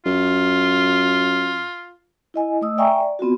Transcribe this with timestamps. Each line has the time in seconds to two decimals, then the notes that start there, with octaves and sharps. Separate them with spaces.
0.06 F#2 F4
2.34 E4 D#5 G#5
2.61 A3 D#5 D#6 E6
2.78 D5 E5 G5 G#5 A#5 C#6
3.01 D5
3.19 B3 C4 F4 F#4